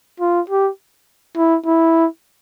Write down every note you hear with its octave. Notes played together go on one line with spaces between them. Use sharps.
F4
G4
E4
E4